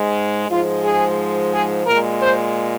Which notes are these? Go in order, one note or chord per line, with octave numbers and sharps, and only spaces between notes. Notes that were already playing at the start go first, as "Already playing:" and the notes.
Already playing: G#2 G#3
G#2 F3 G#3 F4
G#4
G#4
A#2 G#3 A#4
C5